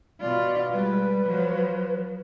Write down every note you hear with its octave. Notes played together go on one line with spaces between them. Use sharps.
B2 F4 D5
G3 G#3 B4
F3 F#3